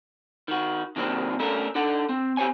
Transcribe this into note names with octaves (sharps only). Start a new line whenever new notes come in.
D#3 F#4
C3 D#3 F#3 A#3 C4 D4
A3 C#4 D4 A4 A#4
D4 D#4 A4 F#5
C4
C4 G4 C5 C#5 G#5